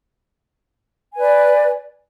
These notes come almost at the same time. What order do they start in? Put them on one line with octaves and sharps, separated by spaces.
G#5 B4 D5